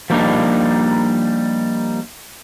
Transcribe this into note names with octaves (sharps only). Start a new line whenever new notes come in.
F3 G3 A#3 D4 D#4